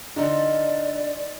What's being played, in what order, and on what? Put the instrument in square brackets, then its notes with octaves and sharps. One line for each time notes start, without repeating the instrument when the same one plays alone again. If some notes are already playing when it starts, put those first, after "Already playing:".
[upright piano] D3 [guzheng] D#4 F4 A4 [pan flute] D5